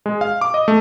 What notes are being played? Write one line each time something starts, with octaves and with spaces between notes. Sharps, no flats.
G#3
F5
D6
D#5
A3